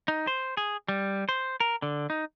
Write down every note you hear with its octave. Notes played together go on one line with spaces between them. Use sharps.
D#4
C5
G#4
G3
C5
A#4
D3
D#4